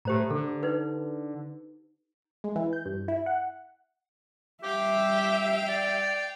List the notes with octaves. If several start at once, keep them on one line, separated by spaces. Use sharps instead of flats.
A2 G4 C5 A#5
D3 A4
D#4 B4
G#3
E3
G6
G2
E4
F#5
G3 G4 E5 F5 G5
D5